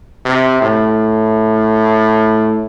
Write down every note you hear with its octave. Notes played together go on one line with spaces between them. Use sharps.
C3
A2